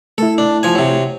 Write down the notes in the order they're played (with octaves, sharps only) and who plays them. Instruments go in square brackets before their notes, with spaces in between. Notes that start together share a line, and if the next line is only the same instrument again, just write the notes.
[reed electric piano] A3 E4 [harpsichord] A4
[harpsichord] D4
F3 G#5
C3 F#3